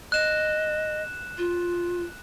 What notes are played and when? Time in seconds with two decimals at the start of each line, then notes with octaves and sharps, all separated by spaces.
0.12 D#5 F#6 E7
1.38 F4